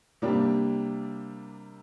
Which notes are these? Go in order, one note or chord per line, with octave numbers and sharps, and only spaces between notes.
C3 G3 A#3 D4 G4